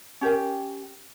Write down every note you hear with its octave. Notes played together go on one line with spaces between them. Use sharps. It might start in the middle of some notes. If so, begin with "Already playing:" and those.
C#4 G4 A#4 G5